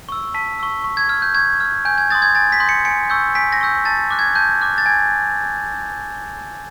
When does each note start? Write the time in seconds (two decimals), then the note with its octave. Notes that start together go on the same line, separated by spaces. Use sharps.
0.09 C#6 E6
0.34 A5 B6
0.60 C#6 E6
0.84 C#6
0.97 G#6
1.09 F6
1.22 G6
1.35 C#6 G#6
1.60 F6
1.85 G#5 G6
1.98 G#6
2.10 C6 D#6 G6 A6
2.22 G#6
2.35 G#5 A6
2.52 B6
2.60 C6 D#6 G6
2.69 C#7
2.85 G#5 C#7
3.10 C#6 E6 G6
3.35 G#5 B6
3.53 A#6
3.61 C#6 E6 G6
3.85 A5 A6
4.11 D6 F#6
4.19 G#6
4.35 A5 G6
4.61 D6 F#6
4.78 A6
4.86 G#5 G#6